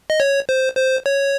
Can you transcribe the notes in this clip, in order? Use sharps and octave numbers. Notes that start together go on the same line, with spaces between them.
D#5
C#5
C5
C5
C#5